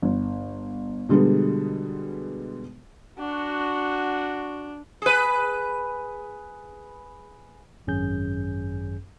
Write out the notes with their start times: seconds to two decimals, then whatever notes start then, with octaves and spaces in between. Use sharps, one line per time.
0.02 G1
1.09 B2 D3 G3 G#3 B3
3.19 D4 F#4
5.02 G#4 B4
7.87 G#1 F#2 C#4 G#4 G6